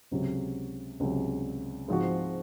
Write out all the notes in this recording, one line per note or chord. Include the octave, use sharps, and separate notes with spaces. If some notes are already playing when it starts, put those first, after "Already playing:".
C#2 C3 F#3
C#2 C3 F#3
G#2 F3 C4 F#4